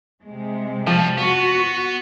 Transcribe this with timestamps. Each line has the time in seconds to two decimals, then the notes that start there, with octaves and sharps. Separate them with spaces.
0.24 C3 G#3
0.87 B2 F3 G3
1.18 B3 F#4